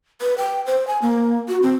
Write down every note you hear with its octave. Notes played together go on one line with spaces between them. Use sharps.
B4
G5
C5
G#5
A#3
F#4
C4